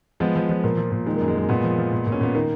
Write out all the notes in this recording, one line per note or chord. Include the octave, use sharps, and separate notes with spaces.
F3 G#3 B3
F3
F3 G#3
A#2 A#3
F3
A#2
D#3 G#3
F#2 A#3
G#3
F#2 A#3
A#2 G#3 B3
F3
F3
A#2
A#2
C#4
A#2 B3
D#3 A#3